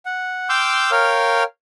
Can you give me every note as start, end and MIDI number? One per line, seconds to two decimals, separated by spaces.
0.06 0.48 78
0.49 0.91 79
0.49 0.91 84
0.49 0.91 86
0.49 0.91 88
0.49 0.91 89
0.49 0.91 91
0.91 1.43 70
0.91 1.43 73
0.91 1.43 77
0.91 1.43 79
0.91 1.43 89